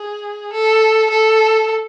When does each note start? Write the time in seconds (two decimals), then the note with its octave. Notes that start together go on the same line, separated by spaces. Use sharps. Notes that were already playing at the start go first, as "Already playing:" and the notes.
Already playing: G#4
0.53 A4
1.10 A4